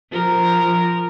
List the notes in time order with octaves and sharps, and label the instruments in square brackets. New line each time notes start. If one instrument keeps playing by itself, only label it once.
[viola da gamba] F3 A#4